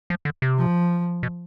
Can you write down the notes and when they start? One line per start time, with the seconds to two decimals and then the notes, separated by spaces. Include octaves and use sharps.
0.10 F3
0.25 D3
0.42 C3
0.58 F3
1.23 B2